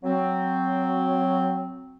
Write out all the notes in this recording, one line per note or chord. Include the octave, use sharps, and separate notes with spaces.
F#3 C4